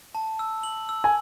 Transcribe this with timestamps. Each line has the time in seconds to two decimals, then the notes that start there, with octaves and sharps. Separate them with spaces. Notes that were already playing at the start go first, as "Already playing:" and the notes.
0.15 A5
0.39 E6
0.63 F#7
0.89 E6
1.04 G#5